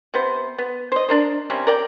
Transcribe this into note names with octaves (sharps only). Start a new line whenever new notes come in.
C3 B3 C5
B3
C5 D#5
D4 A#4 C5
C3 G3 C4 C#4
A#4 D5 G5